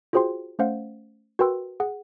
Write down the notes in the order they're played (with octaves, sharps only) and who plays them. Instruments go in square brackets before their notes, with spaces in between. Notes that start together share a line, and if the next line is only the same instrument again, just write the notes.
[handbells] F4 F#4 G#4 C5 G5 C6
A3 C#4 C5 F5 F#5
F#4 A#4 B4 G5 C6 E6
G#4 F#5